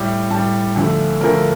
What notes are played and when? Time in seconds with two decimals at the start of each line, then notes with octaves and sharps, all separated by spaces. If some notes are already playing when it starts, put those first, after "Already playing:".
Already playing: A2 G3
0.30 A2 G3 A5
0.76 D2 D3 F3 A3
1.20 D2 D3 F3 A3 A#4